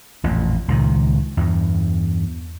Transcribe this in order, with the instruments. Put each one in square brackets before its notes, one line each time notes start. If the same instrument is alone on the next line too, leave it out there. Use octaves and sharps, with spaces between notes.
[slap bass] A1 F2 A#2
C#2 A#2 D#3
E2 G2